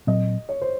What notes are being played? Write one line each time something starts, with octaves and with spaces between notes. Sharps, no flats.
A#2 F#3 C4 D#5
C#5
C5